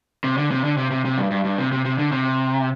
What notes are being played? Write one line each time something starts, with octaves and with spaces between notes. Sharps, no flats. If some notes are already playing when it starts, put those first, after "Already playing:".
C3
D3
C3
D3
C3
C3
C3
G2
G2
G2
C3
C3
C3
D3
C3